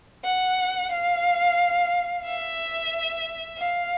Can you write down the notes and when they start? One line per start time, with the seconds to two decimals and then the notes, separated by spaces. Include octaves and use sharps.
0.24 F#5
0.91 F5
2.24 E5
3.57 F5